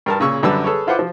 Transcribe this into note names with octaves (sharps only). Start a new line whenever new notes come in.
G2 A#4 A5
A#2 C#3 C#4 C#6 E6
F#2 D3 G3 B4 A5 E6
G#4 A4 B4 C#5
E4 F4 B4 C5 F#5 D6
F3